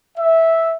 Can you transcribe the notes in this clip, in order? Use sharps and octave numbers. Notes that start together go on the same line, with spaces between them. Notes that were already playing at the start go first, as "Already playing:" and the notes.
E5